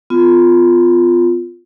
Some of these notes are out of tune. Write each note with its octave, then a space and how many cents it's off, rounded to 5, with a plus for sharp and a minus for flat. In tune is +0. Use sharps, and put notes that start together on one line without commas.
B3 +35 F4 +0